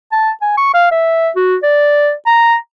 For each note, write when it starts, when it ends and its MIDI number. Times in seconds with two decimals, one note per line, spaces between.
0.12 0.30 81
0.42 0.53 80
0.57 0.72 85
0.74 0.90 77
0.91 1.29 76
1.36 1.56 66
1.63 2.12 74
2.26 2.55 82